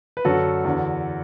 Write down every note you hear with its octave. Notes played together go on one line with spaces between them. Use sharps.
B4
F#2 D3 F#4 A4
E2 D3